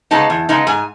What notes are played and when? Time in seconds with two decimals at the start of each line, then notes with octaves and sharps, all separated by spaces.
0.11 C#3 G#3 B3 D#4 A5
0.30 E2
0.49 C#3 G#3 B3 D#4
0.67 G#2 G#5